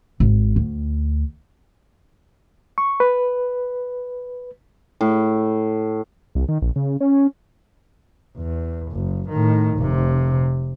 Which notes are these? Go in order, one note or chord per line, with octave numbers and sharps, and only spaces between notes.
G#1
D2
C#6
B4
A2
C2
D#3
A#1
C#3
C#4
E2
F#1
A2 D#3
F1 C3